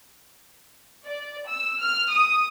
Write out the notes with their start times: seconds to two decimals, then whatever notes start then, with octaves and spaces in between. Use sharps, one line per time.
1.05 D5
1.47 E6
1.79 F6
2.10 D#6